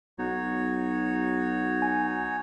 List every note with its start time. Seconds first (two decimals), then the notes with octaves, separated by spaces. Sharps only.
0.19 B1 D#4 F#4 C#5
1.82 G#5